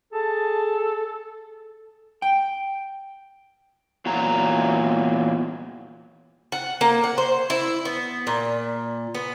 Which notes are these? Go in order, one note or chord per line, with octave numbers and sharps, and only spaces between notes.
G#4 A4 A5
G5
E2 A#2 F#3 A#5
F#5
A#3
F#5
C5
E4
B3
A#2
B3